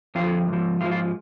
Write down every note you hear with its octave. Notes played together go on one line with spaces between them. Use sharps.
F2 D3 F3 F4
G#2 F3
G#2 F3 F4
F4